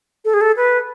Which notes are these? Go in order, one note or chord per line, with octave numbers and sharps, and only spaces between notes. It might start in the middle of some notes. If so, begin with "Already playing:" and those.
A4
G#4
A4
B4